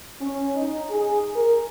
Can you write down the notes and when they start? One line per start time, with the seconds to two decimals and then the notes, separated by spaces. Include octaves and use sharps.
0.21 C#4
0.56 D#4
0.90 G#4
1.36 A#4